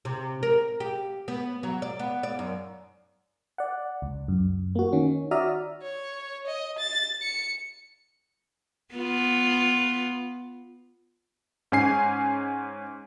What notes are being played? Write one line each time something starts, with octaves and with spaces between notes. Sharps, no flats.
C3
A#4
G4
B3
F#3
D5
B3
D5
F#2
D5 F#5
C#2
F#2
A#3 F#4
D#3 C#4
F#4 D5 E5 A#5 D#6 F6
C#5
D#5
A6
C#7
B3 F4
G#2 C#4 G#5 C7